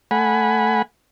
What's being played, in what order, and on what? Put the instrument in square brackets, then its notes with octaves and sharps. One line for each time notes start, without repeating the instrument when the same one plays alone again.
[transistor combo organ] A3 F#5 G#5 B5